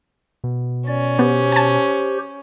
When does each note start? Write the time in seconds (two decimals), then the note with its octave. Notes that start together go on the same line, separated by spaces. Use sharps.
0.44 B2
0.88 C#4 D5
1.19 B3 G4 C5
1.52 G#5 A5